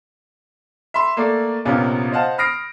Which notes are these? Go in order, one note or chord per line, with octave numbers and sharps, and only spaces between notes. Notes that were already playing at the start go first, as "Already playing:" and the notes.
E5 B5 C6
A3 A#3 A4 D5
A#1 C3 B3 C#4 A#4 F5
C5 D#5 F5 F#5 A5
B5 D#6 F6 A#6 C7 D7